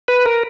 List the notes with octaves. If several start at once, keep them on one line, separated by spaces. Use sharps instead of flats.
B4
A#4